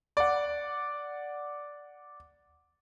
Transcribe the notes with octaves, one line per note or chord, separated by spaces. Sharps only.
D5 F#5